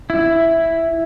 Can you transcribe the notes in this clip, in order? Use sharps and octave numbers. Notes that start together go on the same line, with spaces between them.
E4